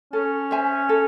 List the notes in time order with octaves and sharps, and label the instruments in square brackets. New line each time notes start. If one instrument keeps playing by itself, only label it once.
[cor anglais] C#4 [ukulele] A4
[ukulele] C5 E5 G#5
A4